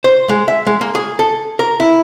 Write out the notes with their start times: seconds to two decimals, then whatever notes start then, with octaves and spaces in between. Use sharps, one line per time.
0.04 C5
0.29 G#3
0.48 E5
0.67 G#3
0.81 A#3
0.95 G#4
1.19 A4
1.59 A#4
1.80 E4